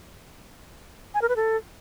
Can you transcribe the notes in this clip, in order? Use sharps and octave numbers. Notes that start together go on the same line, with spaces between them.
G#5
A#4
B4
A4